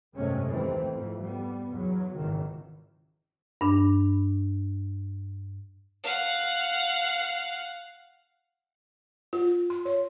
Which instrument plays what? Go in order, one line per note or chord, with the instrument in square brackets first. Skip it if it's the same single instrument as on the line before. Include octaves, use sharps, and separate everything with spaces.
[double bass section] G#1 F#2 C3 G#3 A3 C#4
D#2 E3 A3 C4
F2 G#2 E3
G3 B3
E2 F#3
G#1 C#2 F#2 D#3 E3
[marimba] G2 D4
[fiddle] F5 F#5
[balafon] F4
C6
C#5